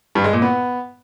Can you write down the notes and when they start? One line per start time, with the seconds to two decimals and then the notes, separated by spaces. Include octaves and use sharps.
0.15 G2
0.24 G#3
0.33 A#2
0.42 B3